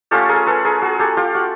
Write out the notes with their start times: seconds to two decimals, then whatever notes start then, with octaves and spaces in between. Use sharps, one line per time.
0.11 A3 C#4 F4 G4 A4
0.29 G#4 A#4
0.46 A4 B4
0.65 G#4 A#4
0.82 F#4 G#4
0.99 G4 A4
1.17 F4 G4
1.35 F#4